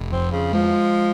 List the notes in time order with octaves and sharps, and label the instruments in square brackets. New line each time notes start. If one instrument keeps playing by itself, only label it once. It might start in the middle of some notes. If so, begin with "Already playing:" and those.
Already playing: [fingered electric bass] F1
[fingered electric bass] F2 [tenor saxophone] C4
[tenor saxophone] C#3
[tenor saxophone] F3 [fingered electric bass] G#3